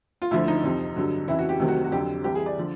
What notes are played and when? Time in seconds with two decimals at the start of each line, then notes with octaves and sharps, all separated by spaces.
0.22 F4
0.31 D2 D3 F3 E4
0.48 D#4
0.64 F2 C3 F3
0.96 G2 D3 F#3
1.27 F2 C#3 E3 E4
1.39 F#4
1.49 G4
1.59 D2 C3 D#3 F#3
1.68 F#4
1.84 F#4
1.92 F2 D3 F#3 G4
2.24 C2 C3 E3 G4
2.35 G#4
2.46 D5
2.58 D3 F3